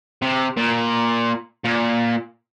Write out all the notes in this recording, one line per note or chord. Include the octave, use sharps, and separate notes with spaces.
C3
A#2
A#2